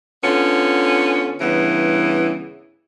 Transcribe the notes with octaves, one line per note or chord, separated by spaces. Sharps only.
D3 B3 C#4 F4
G2 C#3 E3 B3